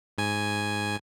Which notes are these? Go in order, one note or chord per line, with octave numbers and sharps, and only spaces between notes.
G#2 G#5